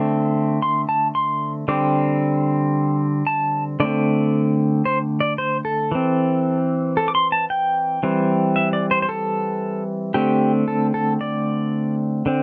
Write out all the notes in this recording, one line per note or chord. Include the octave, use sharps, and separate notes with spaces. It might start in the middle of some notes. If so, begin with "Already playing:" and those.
Already playing: D3 A3 C4 D6
C6
A5
C6
D3 G3 C4 D6
A5
D3 A3 C4 D5
C5
D5
C5
A4
E3 C4
A4
D6
C6
A5
G5
E3 G3 C4
E5
D5
C5
C5
A4
D3 A3 C4 G4
A4
A4
D5
D3 C4